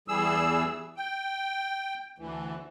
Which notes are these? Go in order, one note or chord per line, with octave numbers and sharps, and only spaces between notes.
E2 E3 G3 G#4 E6
G5
D2 E3